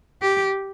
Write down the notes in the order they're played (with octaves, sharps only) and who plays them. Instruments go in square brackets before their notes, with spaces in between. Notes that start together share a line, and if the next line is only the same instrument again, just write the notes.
[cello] G4